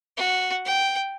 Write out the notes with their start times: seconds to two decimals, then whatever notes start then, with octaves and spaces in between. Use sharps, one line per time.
0.17 F#4
0.65 G5